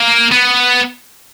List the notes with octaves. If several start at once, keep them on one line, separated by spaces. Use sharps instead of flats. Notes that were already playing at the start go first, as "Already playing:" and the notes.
Already playing: A#3
B3